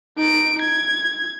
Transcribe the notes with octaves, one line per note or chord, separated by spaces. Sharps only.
D#4 D7
G#6